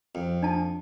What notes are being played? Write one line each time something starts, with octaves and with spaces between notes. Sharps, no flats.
F2
D4 A5